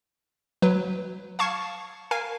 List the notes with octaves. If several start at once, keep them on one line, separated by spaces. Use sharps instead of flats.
F#3 B4
F5 A5 C#6 G#6 C7
A#4 F5 G#5